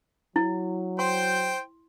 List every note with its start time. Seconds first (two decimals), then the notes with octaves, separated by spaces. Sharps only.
0.36 F#3 E4
0.99 C5 G5 C6